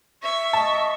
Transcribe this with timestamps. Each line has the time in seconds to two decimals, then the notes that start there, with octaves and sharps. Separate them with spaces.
0.23 E5 C#6
0.53 D#5 A5